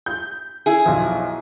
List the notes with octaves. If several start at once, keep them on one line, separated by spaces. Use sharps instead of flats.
G6
E4 G#4
B1 F3